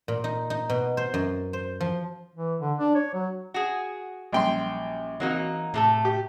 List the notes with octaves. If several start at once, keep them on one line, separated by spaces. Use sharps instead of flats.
A#2
D#4
D#4
B2
C5
F#2
C5
F3
E3
D3
D4
C#5
F#3
F#4 G#4
A#1 F#3 G3 C#4 G5 C6
E3 F#3 A#3 C4 D#4 F#4
A2 C3 A3 A4
G4